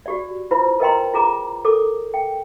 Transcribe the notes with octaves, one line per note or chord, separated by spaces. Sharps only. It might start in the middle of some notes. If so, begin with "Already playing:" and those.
F#4 G4 D5
E4 F4 B4 C5 B5
A#4 B4 D#5 G5 A#5 C6
F4 G#4 A#5 D6
A4 A#4 D6
G5